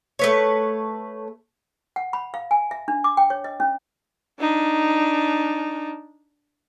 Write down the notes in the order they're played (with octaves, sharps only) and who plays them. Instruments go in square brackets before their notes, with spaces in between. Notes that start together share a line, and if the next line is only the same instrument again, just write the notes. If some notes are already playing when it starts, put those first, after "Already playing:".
[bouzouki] A3 B4 C#5
[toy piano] F#5
B5
F5
G#5
E5
D4
D6
G5
C#5
D#5
C#4
[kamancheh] D4 D#4